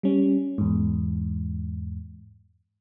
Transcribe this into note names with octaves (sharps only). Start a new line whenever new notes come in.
G3 C#4
E2 G#2